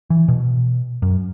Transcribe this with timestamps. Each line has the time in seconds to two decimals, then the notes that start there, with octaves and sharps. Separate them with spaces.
0.10 E3
0.28 B2
1.02 F#2